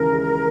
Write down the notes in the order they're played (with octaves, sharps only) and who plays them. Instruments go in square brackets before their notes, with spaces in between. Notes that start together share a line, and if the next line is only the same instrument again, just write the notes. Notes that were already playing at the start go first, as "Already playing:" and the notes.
Already playing: [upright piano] D#2 C#3 E3 G#3 [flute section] A#4
[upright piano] G#3